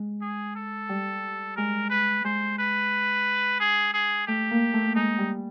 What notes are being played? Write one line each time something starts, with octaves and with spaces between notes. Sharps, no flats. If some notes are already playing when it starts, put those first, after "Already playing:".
Already playing: G#3
G#4
A4
G3
G#3 A#4
B4
G#3 C5
B4
G#4
G#4
A3 G4
A#3
A3
G#3 D#4
G3